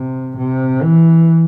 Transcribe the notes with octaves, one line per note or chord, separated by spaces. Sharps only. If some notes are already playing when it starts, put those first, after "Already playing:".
Already playing: C3
C3
E3